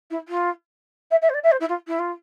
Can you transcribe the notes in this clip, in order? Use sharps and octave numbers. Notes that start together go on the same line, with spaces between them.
E4
F4
E5
E5
C5
D5
E5
C5
E4
F4
E4
F4